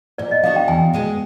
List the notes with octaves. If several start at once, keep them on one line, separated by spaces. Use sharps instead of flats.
A#2 D5
D#5
G3 B3 D4 F#4 F5
G5
E2 G#5
B2 G#3 B3